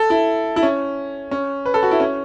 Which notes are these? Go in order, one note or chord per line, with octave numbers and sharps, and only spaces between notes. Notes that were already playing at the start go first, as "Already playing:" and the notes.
Already playing: A4
E4
E4
C#4
C#4
B4
A4
F#4
E4
C#4